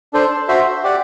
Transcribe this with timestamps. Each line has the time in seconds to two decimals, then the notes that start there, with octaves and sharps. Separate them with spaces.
0.13 D4 A4 C5
0.48 F#4 C5 E5
0.84 G4 D5 F#5